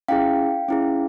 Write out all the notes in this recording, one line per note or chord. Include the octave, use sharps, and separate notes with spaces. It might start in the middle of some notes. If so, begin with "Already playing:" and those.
C#4 E4 G#4 F5 G5
C#4 E4 G#4